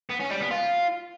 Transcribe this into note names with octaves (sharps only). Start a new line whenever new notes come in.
B3
C#4
G3
B3
F4